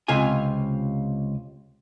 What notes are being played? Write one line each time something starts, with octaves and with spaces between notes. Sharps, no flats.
C#2 C3 F4 G#5